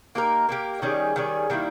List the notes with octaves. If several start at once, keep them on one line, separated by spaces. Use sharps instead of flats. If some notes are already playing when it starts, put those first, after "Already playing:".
A#3 D#4 G4 A#4
A#3 D#4 G4 A#4
D#3 G3 C#4 G#4
D#3 G3 C#4 G#4
D#3 G3 A#3 E4